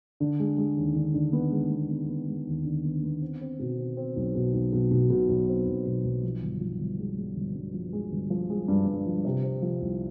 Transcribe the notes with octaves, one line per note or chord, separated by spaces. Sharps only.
D3
G#3
G#3
D#2
D3
D3
B3
G#3
B3
B3
B3
G#3
D#2
D3
B3
B3
C4
C4
B2
C4
C4
B1
B2
B1
B2
B2
B2
B1
C4
B1
B2
B1
F3
G1
F3
G1
G#3
G#3
G1
G2
F3
G#3
G1
F3
G#3
G2
G2
F3
C3
C4
F3
C2